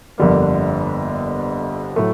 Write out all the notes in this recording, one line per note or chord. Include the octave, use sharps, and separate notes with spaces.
G1 F2 D3 G3 A#3
A2 F#3 A3